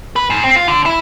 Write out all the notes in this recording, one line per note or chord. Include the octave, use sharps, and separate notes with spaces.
B4
G#2
C4
F4
D3
E4